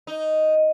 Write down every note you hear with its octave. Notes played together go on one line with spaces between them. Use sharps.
D#4